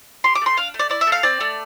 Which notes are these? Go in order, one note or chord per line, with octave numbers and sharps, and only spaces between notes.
G4 C6
D6
A3 C6
D4 F5
A3
D5
E4 D5
E5
A3
F5
C4 D5
A3